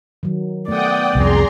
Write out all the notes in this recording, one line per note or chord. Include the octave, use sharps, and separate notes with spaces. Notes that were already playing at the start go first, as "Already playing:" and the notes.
D#3 F#3
A3 B3 D5 F#5 G5 D#6
C2 F2 G#4 A#5 C6